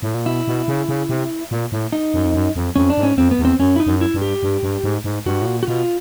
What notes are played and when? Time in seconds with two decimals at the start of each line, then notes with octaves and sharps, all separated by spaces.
0.02 A2
0.15 A#2
0.26 B2 E4
0.47 B2
0.68 C#3
0.88 C#3
1.09 C3
1.51 A#2
1.72 A2
1.92 D#4
2.14 F#2
2.25 F2
2.34 F#2
2.56 F2
2.76 F2 C#4
2.90 D4
2.97 G#2
3.03 C#4
3.18 F2 C4
3.31 B3
3.39 E2
3.45 C4
3.59 F#2 C#4
3.76 E4
3.80 D#4
3.86 F#2
4.01 E4
4.14 G2
4.22 G4
4.43 G2
4.63 G2
4.84 G#2
5.04 G#2
5.26 G2 F#4
5.42 A2
5.46 A#2
5.63 F#4
5.67 B2 F4